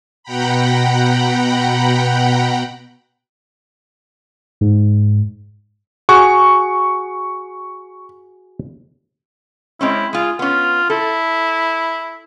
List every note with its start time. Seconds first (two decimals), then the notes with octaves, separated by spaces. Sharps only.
0.23 B2 F#5 G5 A#5 B5
4.61 G#2
6.09 F#4 G#4 C#6
9.81 G#3 C4 C#4 E4
10.13 G#3 F4 G#4
10.39 B3 C#4 F4
10.90 E4 A4